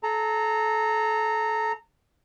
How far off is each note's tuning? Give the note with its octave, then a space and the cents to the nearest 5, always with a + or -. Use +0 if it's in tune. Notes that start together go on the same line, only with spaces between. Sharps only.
A4 -30 A#5 -20